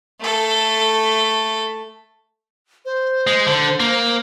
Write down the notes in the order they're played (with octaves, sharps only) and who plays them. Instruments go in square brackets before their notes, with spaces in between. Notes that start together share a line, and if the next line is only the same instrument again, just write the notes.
[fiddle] A3 A4
[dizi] C5
[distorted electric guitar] G#3
D3
A#3